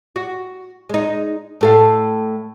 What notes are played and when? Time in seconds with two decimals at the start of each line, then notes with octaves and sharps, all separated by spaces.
0.16 F#4
0.89 G#3 D#4
1.61 A2 A4 F5